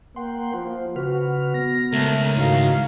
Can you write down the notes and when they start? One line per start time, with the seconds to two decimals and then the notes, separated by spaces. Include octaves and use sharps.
0.16 A#3 F#5 G5 C6
0.54 F3 F4
0.96 C#3 F#4 B4 F6
1.54 B3 A#6
1.93 C#2 A3 A#4
2.36 G#2 D#3 E4 F#4 F5 A#5